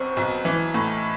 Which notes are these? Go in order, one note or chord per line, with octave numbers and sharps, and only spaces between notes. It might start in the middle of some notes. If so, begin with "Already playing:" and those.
Already playing: B1 B2 C4
B1
E3
A2